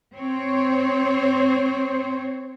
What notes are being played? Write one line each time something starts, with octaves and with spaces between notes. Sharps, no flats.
C4 C5 C#5